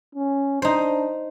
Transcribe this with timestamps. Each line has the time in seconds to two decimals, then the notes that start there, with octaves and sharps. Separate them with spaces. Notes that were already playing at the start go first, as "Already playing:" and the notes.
0.15 C#4
0.62 D4 D#4 C5